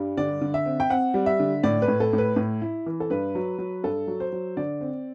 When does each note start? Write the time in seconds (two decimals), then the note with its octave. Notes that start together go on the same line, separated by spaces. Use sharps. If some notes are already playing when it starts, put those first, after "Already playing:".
Already playing: G2 G3
0.17 D3 D5
0.41 D3
0.54 E5
0.66 C4
0.80 G5
0.90 C4 F#5
1.14 G3
1.26 E5
1.40 D3
1.63 A2 D5
1.82 B4
1.88 A2
2.00 A4
2.13 A2
2.18 B4
2.36 A2
2.62 E4
2.86 E3
3.00 A4
3.10 G2 B4
3.35 F#3
3.59 F#3
3.83 G2 A4
4.08 F#3
4.20 C5
4.32 F#3
4.57 D3 D5
4.81 C4